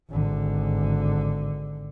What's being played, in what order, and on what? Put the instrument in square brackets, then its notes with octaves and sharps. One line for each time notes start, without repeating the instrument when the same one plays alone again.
[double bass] G#1 D3